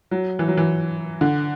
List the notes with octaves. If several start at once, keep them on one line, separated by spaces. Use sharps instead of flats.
F#3
E3
F#3
E3
D3